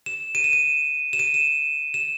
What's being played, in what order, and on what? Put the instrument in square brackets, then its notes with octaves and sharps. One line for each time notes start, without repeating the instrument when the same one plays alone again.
[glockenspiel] E7
D#7
E7
D#7
E7
D#7
E7
E7